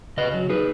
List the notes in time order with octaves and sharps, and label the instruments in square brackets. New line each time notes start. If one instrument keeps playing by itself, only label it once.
[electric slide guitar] C#3 B4 D#5
F#3
D#4 G#4 B4